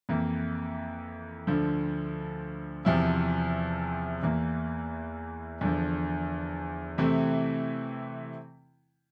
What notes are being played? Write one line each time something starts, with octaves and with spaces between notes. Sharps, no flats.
F2 E3 A#3
D2 D3 F3
E2 C3 F3 C4 E4
E2 E3 A#3
E2 D3 F3
C3 E3 A3 C4 E4